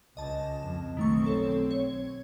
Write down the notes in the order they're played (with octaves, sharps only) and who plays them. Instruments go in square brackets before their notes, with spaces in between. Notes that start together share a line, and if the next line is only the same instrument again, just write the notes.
[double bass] C#2 [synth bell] D#5 A5
[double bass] F2
[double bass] B1 C4 [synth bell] D#3 A3 C#6
[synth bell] A4 C#5
C#5